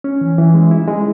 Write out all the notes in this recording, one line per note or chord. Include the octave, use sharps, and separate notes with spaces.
C#4
E3
E3
G#3
E4
G#3